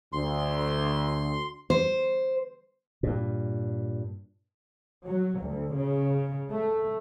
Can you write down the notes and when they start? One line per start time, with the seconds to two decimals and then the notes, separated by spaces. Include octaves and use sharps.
0.13 D2 C6
1.70 C5
3.03 G2 A#2
5.05 F#3
5.40 D2
5.74 C#3
6.49 A3